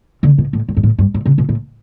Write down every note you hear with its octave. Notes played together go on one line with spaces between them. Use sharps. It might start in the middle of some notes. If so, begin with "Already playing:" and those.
D3
B2
A2
A2
G2
A2
G2
A2
C#3
B2
A2